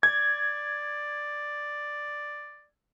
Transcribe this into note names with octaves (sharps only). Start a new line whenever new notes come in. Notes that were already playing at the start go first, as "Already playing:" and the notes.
D5 G#6